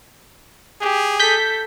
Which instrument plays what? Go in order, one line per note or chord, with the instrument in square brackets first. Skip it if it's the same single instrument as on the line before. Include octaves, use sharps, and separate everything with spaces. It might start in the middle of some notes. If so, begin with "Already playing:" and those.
[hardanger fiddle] G4 [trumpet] G#4
[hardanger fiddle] A4 [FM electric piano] G6 B6